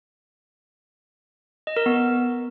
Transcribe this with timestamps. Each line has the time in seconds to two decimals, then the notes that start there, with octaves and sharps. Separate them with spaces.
1.67 D#5
1.76 A#4
1.86 B3